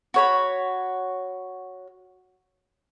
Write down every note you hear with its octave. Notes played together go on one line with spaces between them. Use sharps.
F#4 C#5 B5